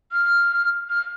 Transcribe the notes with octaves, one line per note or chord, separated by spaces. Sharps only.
F6
F6